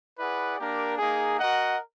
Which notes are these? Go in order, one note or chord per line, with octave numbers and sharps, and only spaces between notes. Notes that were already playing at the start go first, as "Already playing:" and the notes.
E4 G#4 B4 D5 F#5
A#3 D4 G4 A#4
A#3 D#4 G#4
F#4 A#4 D#5 F#5